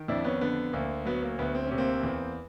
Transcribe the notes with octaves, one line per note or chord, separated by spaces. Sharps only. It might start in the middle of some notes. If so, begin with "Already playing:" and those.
Already playing: D#3
F2 D4 E4
B3 C#4
D3 B3
D2 A#3
F#3 B3
A#3
D2 B3
C4
C3 C#4
A#3 C4
E2